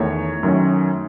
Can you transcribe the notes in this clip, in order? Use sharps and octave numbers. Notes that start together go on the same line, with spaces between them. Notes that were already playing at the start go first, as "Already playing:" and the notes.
Already playing: E2 D#3 A3 C#5
F#2 D#3 A3 C#4